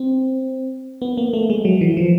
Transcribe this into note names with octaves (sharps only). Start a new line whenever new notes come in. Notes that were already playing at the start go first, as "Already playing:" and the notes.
Already playing: C4
B3
A#3
A3
G#3
F#3
E3
F3